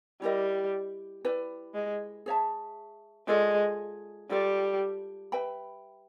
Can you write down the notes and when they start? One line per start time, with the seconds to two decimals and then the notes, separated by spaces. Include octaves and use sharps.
0.22 G3 E4 G4 A#4 D#5
1.25 E4 G4 B4 D5
1.75 G#3
2.26 G#4 C#5 E5 A5
3.27 G#3 F4 A4 D5
4.30 G3 F4 A4 D5
5.32 B4 E5 G5 B5